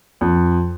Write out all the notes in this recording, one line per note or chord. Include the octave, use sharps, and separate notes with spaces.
F2